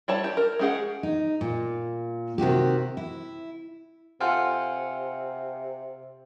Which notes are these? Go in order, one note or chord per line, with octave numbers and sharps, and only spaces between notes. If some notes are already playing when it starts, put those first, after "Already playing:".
G3 E4 C#5 A5
G4
A#4
G#3 C#4 G4 G#4 F#5
D#4
A#2
C3 D#3 F#4 G4
E4
C3 C4 F4 A4 F#5 G#5 F6